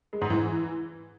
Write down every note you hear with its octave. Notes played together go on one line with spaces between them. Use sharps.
G#3
G#2
E3